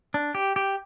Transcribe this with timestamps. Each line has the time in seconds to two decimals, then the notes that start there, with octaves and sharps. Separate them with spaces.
0.14 D4
0.35 G4
0.56 G4